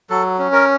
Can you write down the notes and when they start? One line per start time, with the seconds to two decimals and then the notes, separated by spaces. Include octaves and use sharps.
0.10 F#3 A4
0.39 C#4
0.53 A#4